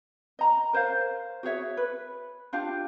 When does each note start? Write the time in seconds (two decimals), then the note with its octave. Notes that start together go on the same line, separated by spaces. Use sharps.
0.39 D#5 A#5
0.73 A#4 C5 C#5 F5
1.43 F#4 G#4 C#5 E5
1.77 B4
2.53 D4 F4 G4 F5